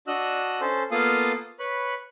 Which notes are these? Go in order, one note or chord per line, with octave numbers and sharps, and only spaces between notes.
D4 F#4 D#5 E6 F#6
C#4 A4 C5
A#3 B3 F4 A4 F5 D#6
B4 C#5 B5